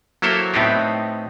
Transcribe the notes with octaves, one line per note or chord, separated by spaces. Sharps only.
F#3 A#3 E4 A4 C5 C#5
A2 B3 C4 D#4 G4